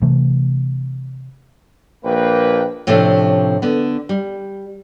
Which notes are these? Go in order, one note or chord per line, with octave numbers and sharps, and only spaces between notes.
C3 E3 A3
A#1 A#3 B4 G5
A2 C3 F3 A3 C#4 D4
D3 B3
G3